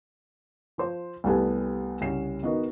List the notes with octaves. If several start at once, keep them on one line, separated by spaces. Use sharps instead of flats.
F3 C5
C2 G3 A3 B3 G#5
C2 C#3 C#4 C7 E7
D#3 B3 D#4 F#4